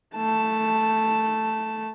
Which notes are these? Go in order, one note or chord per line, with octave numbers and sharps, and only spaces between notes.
A3 A5